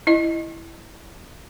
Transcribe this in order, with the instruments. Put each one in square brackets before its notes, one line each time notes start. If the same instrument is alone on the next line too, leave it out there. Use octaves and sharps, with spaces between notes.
[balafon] E4 D#5